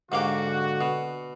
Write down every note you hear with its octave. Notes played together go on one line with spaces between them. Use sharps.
G#2 D3 A#3 F#4 G4
B2